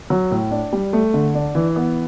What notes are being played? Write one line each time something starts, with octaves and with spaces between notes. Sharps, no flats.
F#3
A2
D4
G3
A3
D3
D4
E3
B3